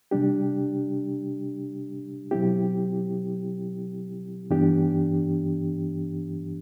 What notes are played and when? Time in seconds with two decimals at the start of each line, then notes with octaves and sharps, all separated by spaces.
0.11 C3 G3 D4 G4
2.31 B2 F#3 C4 E4 G4
4.50 G2 E3 B3 D4 G4